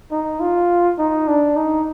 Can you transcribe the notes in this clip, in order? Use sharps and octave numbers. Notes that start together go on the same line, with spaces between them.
D#4
F4
D#4
D4
D#4